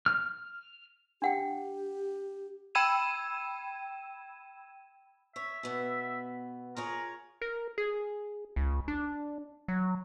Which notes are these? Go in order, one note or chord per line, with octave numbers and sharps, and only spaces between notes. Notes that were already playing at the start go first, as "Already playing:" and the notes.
F6
D4 G4 F#5 G5
G5 B5 E6 G#6 D#7 E7
C#5 E5
B2 B3
F4 G#4 A#4 C#5
A#4
G#4
C#2
D4
F#3